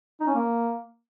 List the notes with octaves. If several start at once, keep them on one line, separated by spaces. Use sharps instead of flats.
D#4
C#4
A#3